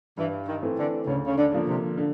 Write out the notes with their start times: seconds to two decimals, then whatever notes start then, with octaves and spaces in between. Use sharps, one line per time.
0.17 G2 E3
0.47 D#3
0.62 E3 A3 C4
0.77 D3
1.07 D2 C#3
1.26 C#3
1.37 D3
1.52 D3 F3 A#3
1.68 C3
1.98 D3